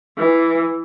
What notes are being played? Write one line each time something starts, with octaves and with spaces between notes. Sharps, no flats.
E3